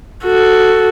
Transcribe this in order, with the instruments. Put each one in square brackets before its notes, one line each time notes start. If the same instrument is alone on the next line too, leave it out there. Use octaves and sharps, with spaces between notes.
[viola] F#4 A4